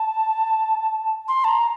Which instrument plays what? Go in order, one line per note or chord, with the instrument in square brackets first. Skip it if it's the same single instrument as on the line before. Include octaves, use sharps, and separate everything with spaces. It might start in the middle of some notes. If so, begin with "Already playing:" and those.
Already playing: [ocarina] A5
C6
A5
A#5